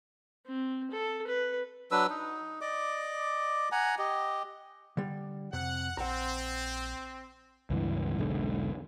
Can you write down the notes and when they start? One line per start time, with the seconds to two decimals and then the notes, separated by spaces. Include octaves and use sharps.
0.46 C4
0.91 A4
1.28 B4
1.91 F#3 D4 B4 E6
2.10 D#4
2.61 D5 D#5 D6
3.72 F#5 G#5 A#5
3.98 G4 D#5
4.97 D3 G3
5.53 F2 C3 F#5
5.97 A#1 C4 F#5 A#5
7.70 C#2 G2 E3
8.18 E1 B1 G#2 D3